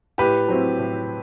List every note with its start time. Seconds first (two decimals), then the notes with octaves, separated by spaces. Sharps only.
0.18 A2 G4 B4
0.48 F#3 C4 E4
0.78 A2